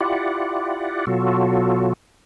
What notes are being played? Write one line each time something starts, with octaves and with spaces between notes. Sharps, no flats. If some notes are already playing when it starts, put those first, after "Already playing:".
E4 F4 G4 D5 F#5
B2 F#3 F4 F#4 A4